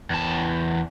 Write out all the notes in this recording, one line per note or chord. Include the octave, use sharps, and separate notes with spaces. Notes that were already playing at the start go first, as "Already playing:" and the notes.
E2 A5